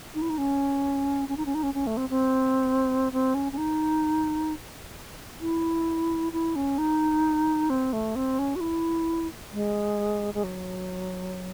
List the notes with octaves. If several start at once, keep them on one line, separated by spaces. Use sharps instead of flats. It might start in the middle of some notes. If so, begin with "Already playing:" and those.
D#4
E4
D#4
C#4
C#4
D#4
C#4
D#4
C#4
C#4
A3
C4
C4
C4
C#4
C#4
D#4
E4
E4
C#4
D#4
C4
A3
C4
C#4
F#4
E4
G#3
G#3
F#3